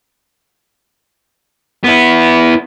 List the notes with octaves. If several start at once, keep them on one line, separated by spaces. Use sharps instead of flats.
B3 E4